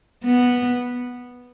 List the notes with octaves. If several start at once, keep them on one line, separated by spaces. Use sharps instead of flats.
B3